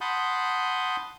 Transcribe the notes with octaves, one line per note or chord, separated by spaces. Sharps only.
F#5 A5 B5 C6 D#6 G6